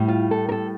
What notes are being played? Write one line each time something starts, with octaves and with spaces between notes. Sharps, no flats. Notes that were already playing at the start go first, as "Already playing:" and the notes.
Already playing: A2 G3
F4
A4
A#4
A4